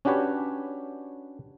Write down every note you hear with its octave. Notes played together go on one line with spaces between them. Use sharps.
C#4 D4 F#4 G4 B4 C#5